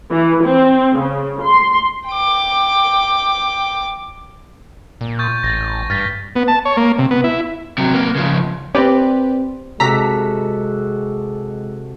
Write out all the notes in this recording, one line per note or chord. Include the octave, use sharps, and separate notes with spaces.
E3
C4
C#3
C6
G5 D6
A#2
C#6 G6 A6
A1 A6 A#6
G2 F6 A6 B6
B3
A5
C#5
A#3
C3
B3
E4
C3 F#3
A#3 B3
C#3 F3
C4 C#4 G4 B4 D5
C3 G#3 F#4 A4 A#5 B6